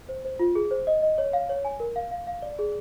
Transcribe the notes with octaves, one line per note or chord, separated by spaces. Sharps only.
C5
C5
F4
G#4
C5
D#5
D#5
C#5
F5
C#5
G#5
A#4
F5
F5
F5
D5
G#4